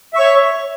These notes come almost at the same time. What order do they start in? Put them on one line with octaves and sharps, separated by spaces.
E5 C#6 C#5